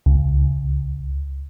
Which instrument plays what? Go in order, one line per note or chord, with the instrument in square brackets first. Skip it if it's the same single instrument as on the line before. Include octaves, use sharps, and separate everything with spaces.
[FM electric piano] C#2